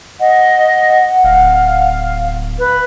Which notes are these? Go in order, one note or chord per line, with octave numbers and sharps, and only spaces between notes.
D#5 F#5
D1 F5
B4